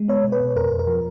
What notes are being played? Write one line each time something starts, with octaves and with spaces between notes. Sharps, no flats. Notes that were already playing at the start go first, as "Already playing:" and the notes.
Already playing: G#3
B3 C#5
B2
B4
B2
F2 A#4
F2
A#4
F3